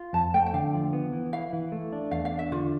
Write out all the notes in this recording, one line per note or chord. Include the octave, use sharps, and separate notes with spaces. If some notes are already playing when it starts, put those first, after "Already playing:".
Already playing: F4
F2 A5
A3 G5
G5
D3 F5
F3
B3
E3
E4 F5
E3
A3
D4
E2 F5
F5
D4
E5
D3 F4